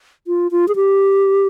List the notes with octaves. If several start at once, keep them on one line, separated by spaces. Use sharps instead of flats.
F4
F4
G#4
G4